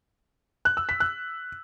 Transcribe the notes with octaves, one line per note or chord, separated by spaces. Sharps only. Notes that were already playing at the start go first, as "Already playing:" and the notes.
F#6
E6
B6
F#6